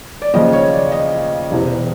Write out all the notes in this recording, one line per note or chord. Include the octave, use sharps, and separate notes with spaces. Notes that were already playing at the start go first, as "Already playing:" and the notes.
D5
D#2 C#3 F3 D#5
C#5
D5
D#5
E1 E2 C3